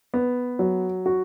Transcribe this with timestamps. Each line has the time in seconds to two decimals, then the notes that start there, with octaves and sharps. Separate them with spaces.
0.14 B3
0.59 F#3
1.06 F#4